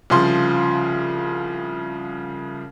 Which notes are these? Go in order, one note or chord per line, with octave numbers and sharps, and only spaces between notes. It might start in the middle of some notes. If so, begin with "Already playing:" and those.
C2 C#3 F3 C6